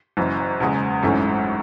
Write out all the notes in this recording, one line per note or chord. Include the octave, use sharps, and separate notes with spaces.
F#1 F#2 E3
E2 C#3 G#3
G#1 F#2 E3 A3 C#4